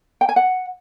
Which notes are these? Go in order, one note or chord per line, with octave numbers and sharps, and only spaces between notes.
G5
G#5
F#5